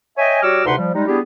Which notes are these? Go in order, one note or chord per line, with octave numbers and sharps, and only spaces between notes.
C#5 D#5 E5 G5 G#5
G3 F#4 C#5 D6 E6 F6
D2 C3 D#4 B4 F#5 C6
F3 G3
G3 G#3 D#4
G3 B3 D4 E4 G4 G#4